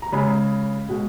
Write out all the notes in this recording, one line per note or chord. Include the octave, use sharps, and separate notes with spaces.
A#5
C#3 G#3 G#5 B5
B2 G#3